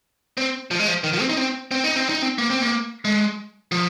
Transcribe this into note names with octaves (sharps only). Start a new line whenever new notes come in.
C4
F3
G#3
F3
D#3
F3
C4
D#4
C4
C4
D#4
C4
D#4
C4
A#3
C4
A#3
G#3
F3